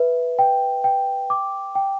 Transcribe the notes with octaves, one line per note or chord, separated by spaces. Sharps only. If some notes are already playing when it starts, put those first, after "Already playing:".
Already playing: B4 E5
G5
G5
D6
G5